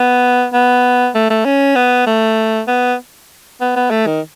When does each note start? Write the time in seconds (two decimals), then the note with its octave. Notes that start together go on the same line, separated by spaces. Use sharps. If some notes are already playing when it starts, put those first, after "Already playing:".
Already playing: B3
0.53 B3
1.15 A3
1.30 A3
1.45 C#4
1.76 B3
2.07 A3
2.68 B3
3.61 B3
3.76 B3
3.91 A3
4.07 D#3